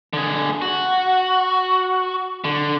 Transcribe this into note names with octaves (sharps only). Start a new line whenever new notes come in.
D3 G#4
F#4
D3